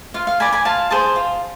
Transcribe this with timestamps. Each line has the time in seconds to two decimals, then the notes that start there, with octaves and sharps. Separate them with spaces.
0.14 F4 F5
0.27 F5
0.40 B4 D5 G#5 B5
0.53 G#5 B5
0.65 F4 F5 A5
0.90 G#4 C5 A5 C6
1.16 F4